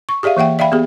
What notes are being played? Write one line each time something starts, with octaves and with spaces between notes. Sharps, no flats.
C#6
G4 G#4 D5 E5 F5
E3 A#3 E5 F#5 G5
D5 E5 F5 G5 B5
B3 G4 G#4